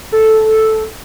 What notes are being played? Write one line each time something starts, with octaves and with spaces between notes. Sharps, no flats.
A4